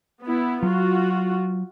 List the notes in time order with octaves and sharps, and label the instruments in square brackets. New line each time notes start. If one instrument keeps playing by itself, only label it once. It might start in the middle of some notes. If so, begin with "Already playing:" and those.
[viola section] B3 E4
[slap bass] F#3 [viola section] F4 F#4